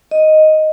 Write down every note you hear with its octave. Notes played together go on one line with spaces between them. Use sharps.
D#5